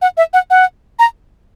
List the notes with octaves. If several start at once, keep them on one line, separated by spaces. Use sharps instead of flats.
F#5
E5
F#5
F#5
A#5